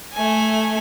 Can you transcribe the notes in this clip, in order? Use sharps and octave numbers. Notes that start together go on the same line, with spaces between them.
A3 G#5